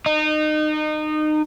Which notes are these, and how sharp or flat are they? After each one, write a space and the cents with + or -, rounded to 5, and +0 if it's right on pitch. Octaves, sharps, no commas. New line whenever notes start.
D#4 -25